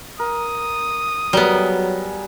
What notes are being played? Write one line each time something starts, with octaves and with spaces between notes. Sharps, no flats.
A#4 D#6
F#3 G3 B3 G#4 A#4